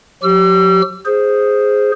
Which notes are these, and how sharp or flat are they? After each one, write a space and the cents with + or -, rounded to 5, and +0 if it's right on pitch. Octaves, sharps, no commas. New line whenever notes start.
F#3 -45 G4 -30 E6 +40
G#4 +0 C5 +0